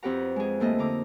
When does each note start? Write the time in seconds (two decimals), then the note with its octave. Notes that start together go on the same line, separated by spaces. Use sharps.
0.03 F2 C4 G4 B4 F#5 A#5
0.36 G#3 G#4
0.60 D2 A3 A#3 D#5
0.79 D3 D#4 A#5 D6